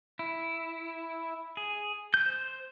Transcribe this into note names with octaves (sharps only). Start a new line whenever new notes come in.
E4
G#4
G6
C5